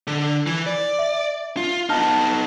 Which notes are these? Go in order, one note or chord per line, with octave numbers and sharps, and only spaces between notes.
D3
E3
D5
E5
F4
B3 D#4 A5 F6